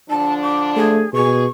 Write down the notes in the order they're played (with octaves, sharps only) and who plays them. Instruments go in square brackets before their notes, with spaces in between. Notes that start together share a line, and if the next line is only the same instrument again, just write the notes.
[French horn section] D3 F3 D4 [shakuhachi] A5
[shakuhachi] D6
[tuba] A3 [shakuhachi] G#4
[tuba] B2 [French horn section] G#4 [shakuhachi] C#6